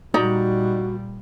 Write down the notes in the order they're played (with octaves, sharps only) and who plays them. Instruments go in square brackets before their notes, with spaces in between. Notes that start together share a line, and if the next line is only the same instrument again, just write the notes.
[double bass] A#2 G3 [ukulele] D#4 D5 A#5 [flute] F#4